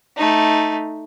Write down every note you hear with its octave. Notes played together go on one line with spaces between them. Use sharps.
A3 D#4